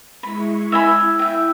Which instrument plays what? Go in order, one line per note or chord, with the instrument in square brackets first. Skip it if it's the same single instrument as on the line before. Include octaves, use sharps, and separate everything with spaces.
[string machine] G#3 E4 C#6 [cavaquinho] B5
[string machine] E4 [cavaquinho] E5 G#5 B5
[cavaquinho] E5 G5